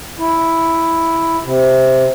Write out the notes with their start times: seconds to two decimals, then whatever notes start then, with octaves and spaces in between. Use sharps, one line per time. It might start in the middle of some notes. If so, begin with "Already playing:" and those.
0.19 E4
1.44 C3